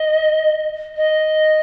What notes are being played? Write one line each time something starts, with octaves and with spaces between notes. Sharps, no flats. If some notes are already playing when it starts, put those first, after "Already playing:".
Already playing: D#5
D#5